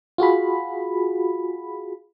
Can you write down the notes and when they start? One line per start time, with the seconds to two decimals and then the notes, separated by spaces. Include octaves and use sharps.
0.18 F4 F#4 G#4 B5